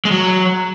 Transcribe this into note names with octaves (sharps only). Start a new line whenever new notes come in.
G#3
F#3